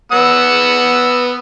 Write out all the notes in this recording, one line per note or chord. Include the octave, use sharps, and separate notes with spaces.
B3 F#5 E6